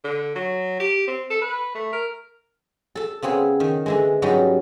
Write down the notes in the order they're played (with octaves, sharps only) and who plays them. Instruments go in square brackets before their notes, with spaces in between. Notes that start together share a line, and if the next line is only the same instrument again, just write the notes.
[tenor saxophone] D3
F#3
G4
C4
A4
B4
A3
A#4
[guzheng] A4 A5
C#3 B3 C4 G#4
D#3
D3 E3 G#3
G#2 F#3 G3 B3 C#4 D#4